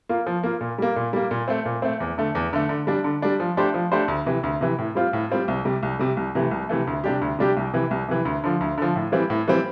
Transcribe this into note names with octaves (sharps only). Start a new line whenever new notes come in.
A#3 F4
F3
A#3 F4
A#2
G3 A#3
A#2
G3 A#3
A#2
A3 C4
A#2
A3 C4
E2
D3 A3
E2
D3 A3
D3
G3 D4
D3
G3 D4
F3
A3 D4 G4 C5
F3
A3 D4 G4 C5
D2
C3 E3
D2
C3 E3
A2
G3 C4 F4
A2
G3 C4 F4
C2
C3 G3
C2
C3 G3
C2
C3 E3 A3
C2
C3 E3 A3
D2
C3 G3 D4 G4
D2
C3 G3 D4 G4
C2
C3 E3
C2
C3 E3
D2
D3 F3
D2
D3 F3
A2
E3 G3 C4
A2
E3 G3 C4